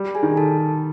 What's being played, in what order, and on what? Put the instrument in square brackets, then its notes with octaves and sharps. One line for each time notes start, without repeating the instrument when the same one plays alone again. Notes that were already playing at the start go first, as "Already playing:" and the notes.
Already playing: [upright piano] G3
[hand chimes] G#4 G#5
[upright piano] D#3
[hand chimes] A4 A5